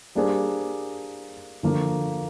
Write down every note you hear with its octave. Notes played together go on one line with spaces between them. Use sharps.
G3 A#3 D4 G#4 C5
D3 F3 A#3